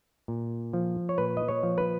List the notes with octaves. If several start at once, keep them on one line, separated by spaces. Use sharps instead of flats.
A#2
F3
C#5
A#2 B4
D#5
C#5
F3
B4